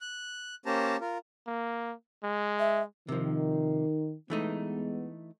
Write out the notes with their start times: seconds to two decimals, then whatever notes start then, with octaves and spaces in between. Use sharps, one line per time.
0.01 F#6
0.66 A#3 C#4 G4 C5 A5 A#5
1.01 F4 A#4
1.47 A#3
2.23 G#3
2.59 E5
3.09 C3 D#3 F3
4.30 E3 G#3 A3 B3 D#4